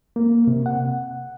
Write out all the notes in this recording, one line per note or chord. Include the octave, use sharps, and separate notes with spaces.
A#3
C3
F#5